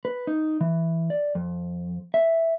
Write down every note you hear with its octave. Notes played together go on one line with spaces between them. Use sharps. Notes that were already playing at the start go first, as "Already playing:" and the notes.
B4
D#4
E3
D5
F2
E5